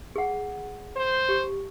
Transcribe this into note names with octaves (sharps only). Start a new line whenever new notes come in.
G#4 F#5
C5
G4